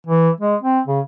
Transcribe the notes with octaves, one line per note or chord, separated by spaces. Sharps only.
E3
G#3
C4
C#3